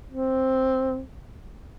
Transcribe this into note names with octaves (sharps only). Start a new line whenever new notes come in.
C4